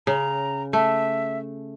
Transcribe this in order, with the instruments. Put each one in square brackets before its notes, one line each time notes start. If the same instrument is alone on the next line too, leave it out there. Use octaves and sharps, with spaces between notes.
[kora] C#3 [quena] A#5
[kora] A3 [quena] E5